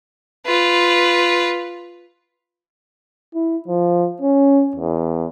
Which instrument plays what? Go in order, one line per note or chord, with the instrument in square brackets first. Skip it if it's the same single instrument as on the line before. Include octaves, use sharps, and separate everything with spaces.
[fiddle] F4 B4
[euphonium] E4
F3
C#4
E2